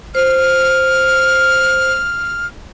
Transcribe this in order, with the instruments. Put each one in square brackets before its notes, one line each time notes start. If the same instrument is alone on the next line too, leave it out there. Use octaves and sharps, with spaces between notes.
[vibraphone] C5 [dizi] F6